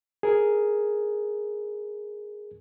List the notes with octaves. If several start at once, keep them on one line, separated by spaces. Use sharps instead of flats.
G#4 A#4